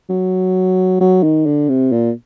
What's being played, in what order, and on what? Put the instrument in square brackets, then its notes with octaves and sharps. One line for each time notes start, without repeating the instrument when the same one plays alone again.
[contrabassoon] F#3
F#3
D#3
D3
C3
A#2